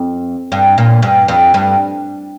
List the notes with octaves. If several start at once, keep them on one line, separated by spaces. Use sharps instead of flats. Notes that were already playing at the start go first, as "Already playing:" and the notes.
Already playing: F2
G2
A#2
G2
F2
G2